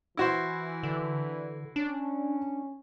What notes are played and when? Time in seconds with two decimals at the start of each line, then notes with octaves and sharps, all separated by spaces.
0.17 E3 E4 F#4 C5
0.83 D3
1.76 C#4 D4